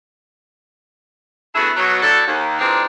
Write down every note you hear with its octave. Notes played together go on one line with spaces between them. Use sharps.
A3 B3 D4 E4 F#4 G#4
B2 F#3
A2 D4 E4 F#4 A4
D#2
A#2 E3 G#3 C4 D4 D#4